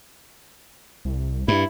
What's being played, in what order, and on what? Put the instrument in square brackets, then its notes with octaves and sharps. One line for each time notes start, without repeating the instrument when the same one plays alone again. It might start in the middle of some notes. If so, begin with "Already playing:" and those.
[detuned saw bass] C2
[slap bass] G2 [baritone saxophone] E4